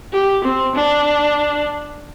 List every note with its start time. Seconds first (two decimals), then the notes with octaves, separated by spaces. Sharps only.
0.13 G4
0.44 C4
0.75 D4